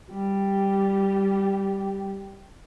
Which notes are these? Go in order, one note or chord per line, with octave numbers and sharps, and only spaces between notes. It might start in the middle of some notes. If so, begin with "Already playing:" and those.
G3 G4